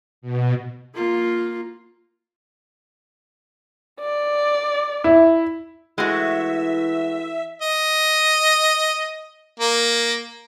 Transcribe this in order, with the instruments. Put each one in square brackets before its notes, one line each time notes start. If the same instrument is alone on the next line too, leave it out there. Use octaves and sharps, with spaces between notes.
[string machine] B2
[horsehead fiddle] A#3 F4
[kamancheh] D5
[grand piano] E4
[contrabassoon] E3 [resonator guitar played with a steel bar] G#3 A3 F#4 [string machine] E5
[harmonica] D#5
A#3